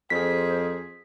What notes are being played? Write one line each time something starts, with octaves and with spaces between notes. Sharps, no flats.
F2 G#4 C5 B6